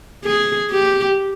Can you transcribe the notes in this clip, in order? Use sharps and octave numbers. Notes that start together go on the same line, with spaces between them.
G#4
G4